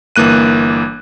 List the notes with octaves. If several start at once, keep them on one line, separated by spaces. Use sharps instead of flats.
G1 E3 A#3 F#6 D#7